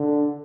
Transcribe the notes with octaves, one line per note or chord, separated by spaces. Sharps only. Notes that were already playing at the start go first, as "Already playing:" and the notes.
Already playing: D3